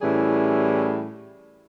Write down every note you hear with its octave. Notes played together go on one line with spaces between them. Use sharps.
A2 E3 G3 C#4 G#4